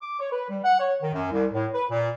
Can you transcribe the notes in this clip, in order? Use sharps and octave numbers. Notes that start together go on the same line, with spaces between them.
D6
C#5
B4
G3
F#5
C#5
D#3
F#2
C2
A2
B4
A#2